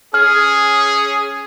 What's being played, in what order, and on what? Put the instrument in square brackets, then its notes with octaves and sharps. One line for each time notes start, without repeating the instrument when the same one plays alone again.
[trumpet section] C#4 G#4 [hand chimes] F6